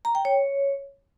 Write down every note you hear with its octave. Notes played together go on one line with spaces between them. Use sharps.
A#5
G5
C#5